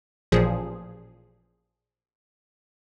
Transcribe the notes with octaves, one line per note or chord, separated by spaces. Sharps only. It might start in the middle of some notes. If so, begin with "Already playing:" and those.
A1 A#2 F3 G#4